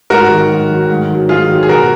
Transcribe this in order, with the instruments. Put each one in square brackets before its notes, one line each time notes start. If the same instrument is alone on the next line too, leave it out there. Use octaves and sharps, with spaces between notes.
[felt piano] G#2 [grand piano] F#4 A#4
[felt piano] D#3 F#3
G#2
D#3 F#3
G#2
D#3 F#3
[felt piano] G#2 [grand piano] F4 G#4
[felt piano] D#3 F#3
[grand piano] G#4
[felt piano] B2 [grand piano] F#4 A#4